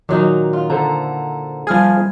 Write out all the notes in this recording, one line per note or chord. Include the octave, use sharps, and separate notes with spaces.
A#2 D#3 F#3 D#4
F4
D3 A4 C5 A#5
F3 G3 G#4 F6 G#6